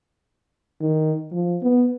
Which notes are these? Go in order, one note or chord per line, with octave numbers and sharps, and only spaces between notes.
D#3
F3
B3